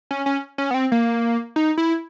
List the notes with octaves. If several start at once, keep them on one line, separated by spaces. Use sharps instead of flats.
C#4
C#4
C#4
B3
C4
A#3
D#4
E4